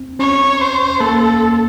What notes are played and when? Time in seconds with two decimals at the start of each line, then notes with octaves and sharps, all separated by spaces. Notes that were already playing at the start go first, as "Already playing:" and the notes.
Already playing: C4
0.19 C#4 C#5
0.61 C5
1.00 A#3 A4